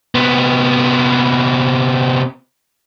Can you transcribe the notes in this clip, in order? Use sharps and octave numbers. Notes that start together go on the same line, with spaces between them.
C3 B3